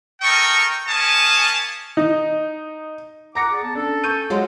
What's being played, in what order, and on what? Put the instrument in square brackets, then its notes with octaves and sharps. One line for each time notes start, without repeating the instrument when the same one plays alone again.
[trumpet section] A4 A#4 D#5 G5 C#6
A#3 C#4 G#5 A5 D#6
[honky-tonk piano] D#4
[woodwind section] F#5 D6 [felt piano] A#5 A#6 C#7
[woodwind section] G#4 D5
B3 A5
[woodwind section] C#4 A4 [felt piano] D4
[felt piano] C#6 G6 D#7
[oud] F#3 G#3 F4